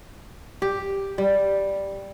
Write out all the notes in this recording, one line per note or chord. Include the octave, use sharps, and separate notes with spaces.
G4
G3